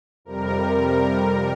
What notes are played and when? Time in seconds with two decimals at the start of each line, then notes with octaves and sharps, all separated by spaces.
0.25 F2 C3 G3 A#4